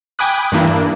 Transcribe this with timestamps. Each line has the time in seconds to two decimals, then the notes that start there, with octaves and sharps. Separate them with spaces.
0.19 G5 G#5 B5 D6 D#6 F#6
0.52 G2 E3 A#3 D4 E4